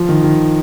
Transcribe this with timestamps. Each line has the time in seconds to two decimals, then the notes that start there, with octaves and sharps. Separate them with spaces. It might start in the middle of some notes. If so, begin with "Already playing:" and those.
Already playing: F3
0.09 D#3
0.24 D#3